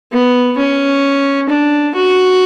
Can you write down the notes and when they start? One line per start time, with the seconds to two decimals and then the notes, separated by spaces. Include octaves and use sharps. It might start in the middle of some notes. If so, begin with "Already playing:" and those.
0.12 B3
0.57 C#4
1.49 D4
1.95 F#4